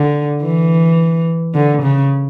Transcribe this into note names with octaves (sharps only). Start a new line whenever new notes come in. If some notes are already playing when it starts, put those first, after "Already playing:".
Already playing: D3
E3
D3
C#3